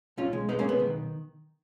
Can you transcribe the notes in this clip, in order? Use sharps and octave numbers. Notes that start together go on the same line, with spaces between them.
B1 C#4 F4
G#3
G#3 B3 D#4
A#3 C#4
B1 B3
D#3